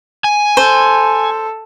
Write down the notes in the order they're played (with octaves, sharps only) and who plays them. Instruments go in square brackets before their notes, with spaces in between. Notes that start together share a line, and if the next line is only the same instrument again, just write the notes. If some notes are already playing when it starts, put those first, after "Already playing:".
[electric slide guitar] G#5
[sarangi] A4 [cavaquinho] C5